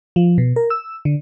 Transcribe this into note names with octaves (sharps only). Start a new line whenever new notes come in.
F3
B2
A#4
E6
D3